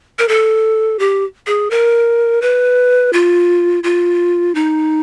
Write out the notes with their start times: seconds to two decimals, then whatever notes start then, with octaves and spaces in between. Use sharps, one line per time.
0.19 A#4
0.28 A4
0.99 G4
1.47 G#4
1.71 A#4
2.42 B4
3.13 F4
3.84 F4
4.55 D#4